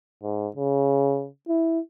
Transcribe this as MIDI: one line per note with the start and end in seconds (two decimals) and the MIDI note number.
0.23 0.48 44
0.56 1.27 49
1.48 1.79 64